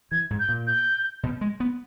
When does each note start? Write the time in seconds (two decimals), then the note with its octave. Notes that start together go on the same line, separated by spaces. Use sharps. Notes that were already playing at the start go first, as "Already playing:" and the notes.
0.11 E3 G#6
0.30 G#2
0.40 G6
0.49 A#2
0.67 G6
1.23 B2
1.41 G#3
1.60 B3